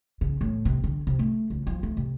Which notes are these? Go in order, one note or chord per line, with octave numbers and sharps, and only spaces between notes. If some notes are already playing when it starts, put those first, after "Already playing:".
C#3
A2
C3
D3
C3
A3
C#2
F3
A3
C3